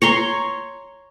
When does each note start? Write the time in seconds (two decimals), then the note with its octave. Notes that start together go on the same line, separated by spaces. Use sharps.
0.02 C#5 A#5 C6